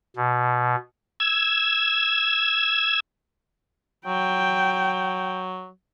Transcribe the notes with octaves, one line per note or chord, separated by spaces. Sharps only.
B2
E6 G#6
F#3 G5